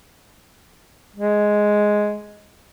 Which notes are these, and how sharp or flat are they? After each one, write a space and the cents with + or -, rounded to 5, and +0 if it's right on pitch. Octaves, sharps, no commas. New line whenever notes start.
G#3 +5